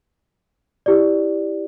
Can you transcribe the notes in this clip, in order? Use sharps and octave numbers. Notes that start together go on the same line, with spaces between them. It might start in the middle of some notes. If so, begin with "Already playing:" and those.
E4 G4 D5